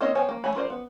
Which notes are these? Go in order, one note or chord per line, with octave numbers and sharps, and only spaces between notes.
A#3 C4 D#4 C#5 D#5
B3 C5 C#5 G5 G#5
A#3
A3 C#5 G#5 B5
F4 A#4 C5 D5
B3